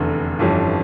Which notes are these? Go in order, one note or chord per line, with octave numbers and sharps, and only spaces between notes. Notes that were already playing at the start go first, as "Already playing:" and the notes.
Already playing: F1 E2 D3
G1 F2 E3 G3 C#4